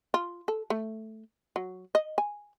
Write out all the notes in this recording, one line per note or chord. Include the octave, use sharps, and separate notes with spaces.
F4
A4
A3
F#3
D#5
G#5